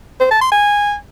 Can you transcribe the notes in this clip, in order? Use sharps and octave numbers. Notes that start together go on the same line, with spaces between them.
C5
A5
C6
G#5